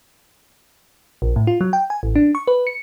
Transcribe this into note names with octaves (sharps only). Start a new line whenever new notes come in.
A#1
A2
F4
F#3
G5
G#5
A1
D4
C#6
B4
C#7